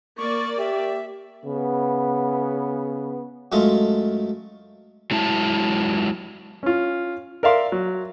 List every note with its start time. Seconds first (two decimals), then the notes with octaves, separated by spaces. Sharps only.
0.18 A#3 D5 C#6
0.58 G4 E5
1.44 C#3 B3
3.52 F#2 G#3 A3 F4 A4 D#5
5.11 F#3 G#3 E4 A5
6.63 C#4 F4
7.43 A#4 D5 E5 F5 C6
7.72 F#3